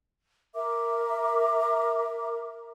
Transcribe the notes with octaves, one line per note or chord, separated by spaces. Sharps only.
A#4 E5 D6